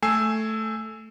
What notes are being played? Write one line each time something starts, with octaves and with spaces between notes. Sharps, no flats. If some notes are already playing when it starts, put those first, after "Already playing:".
A3 G#5 E6 C7